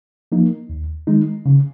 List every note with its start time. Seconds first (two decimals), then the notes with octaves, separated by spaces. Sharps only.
0.32 F3 A#3 D#4
0.69 D#2
1.07 D#3 G#3 D#4
1.46 C#3